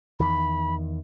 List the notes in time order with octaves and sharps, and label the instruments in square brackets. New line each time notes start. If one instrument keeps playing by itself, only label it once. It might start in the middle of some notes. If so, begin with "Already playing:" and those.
[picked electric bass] E2 D#3 [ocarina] B5